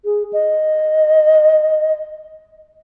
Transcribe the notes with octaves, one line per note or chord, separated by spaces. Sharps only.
G#4
D#5